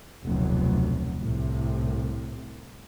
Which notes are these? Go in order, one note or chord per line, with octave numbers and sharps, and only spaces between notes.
F1 D2 B2 F#3
C2 A2 C3